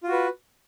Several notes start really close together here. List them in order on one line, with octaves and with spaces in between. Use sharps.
F4 F#4 B4